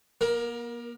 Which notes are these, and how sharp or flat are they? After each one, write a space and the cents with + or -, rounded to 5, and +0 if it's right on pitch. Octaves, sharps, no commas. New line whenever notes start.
A#3 +45 A#4 +15